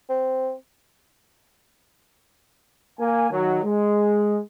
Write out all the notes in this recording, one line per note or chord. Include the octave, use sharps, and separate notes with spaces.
C4
A#3 G#5
D#3 F#3
G#3